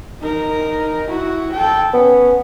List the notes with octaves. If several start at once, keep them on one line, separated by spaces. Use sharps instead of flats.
D#4 A#4
E4 F#4
A4 G5
B3 C#4